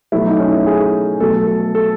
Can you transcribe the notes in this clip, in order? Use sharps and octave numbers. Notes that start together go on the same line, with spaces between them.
B2 F#3 A3 E4
D#4
C#4
E4
G#4
B2 F#3 A3 A4
A4
A4